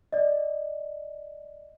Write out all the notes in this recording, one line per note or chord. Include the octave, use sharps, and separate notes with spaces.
D5 D#5